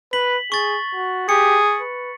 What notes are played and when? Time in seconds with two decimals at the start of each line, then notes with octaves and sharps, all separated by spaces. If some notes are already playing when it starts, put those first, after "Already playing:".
0.13 B4 B6 F#7
0.52 G#4 C#6 A6
0.94 F#4
1.29 G4 G#4 C#7
1.80 B4